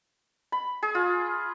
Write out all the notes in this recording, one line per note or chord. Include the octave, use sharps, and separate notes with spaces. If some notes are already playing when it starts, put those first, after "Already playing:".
B5
G#4
F4